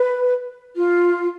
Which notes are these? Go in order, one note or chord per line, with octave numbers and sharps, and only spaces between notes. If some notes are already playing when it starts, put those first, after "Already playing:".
Already playing: B4
F4